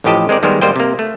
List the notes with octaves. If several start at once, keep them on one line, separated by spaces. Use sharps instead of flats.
A1 A2 F3 G4 D#5 A5
G#3 C4 A#4 D5
D#3 G3 G#3 B3 A#4 C5
G#1 G3 A#3 C5 D#5 G5
C3 A#3
A3